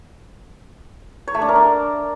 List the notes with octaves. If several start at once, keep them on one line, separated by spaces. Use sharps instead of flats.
C#5
A3
D4
A#4
D4